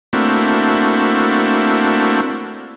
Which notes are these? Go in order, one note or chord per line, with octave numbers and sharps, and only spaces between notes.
A3 A#3 C4 D4 E4 F#4